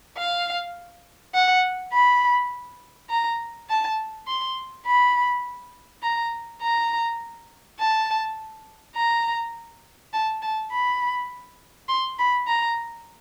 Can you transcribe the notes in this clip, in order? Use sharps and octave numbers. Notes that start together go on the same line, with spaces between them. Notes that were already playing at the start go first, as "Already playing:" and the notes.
F5
F#5
B5
A#5
A5
C6
B5
A#5
A#5
A5
A#5
A5
A5
B5
C6
B5
A#5